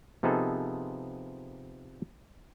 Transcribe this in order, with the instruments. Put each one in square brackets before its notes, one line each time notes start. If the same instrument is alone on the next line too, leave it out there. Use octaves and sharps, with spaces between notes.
[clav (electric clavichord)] C3 F3 B3 D#4 G#4 A4